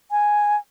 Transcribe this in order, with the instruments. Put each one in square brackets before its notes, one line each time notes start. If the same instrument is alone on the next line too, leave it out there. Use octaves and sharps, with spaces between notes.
[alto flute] G#5